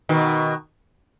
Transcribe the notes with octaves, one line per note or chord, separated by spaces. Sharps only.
B2 D#3